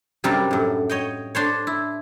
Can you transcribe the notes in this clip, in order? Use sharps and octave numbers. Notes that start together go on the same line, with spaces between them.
F#2 C3 G3 D4 A#4
F#2 A2
C#5 D#5 G5
D4 C5 C#5
E4